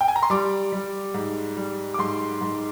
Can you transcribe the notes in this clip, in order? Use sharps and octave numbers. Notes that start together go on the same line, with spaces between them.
G5
G#5
A#5
C6
G3 D6
G3
G#2
G3
D6
G#2 C6
G#2